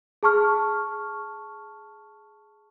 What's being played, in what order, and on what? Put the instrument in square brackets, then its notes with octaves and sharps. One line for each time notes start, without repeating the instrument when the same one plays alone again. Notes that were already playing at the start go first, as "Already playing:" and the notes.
[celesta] G#4 A5 C#6 F6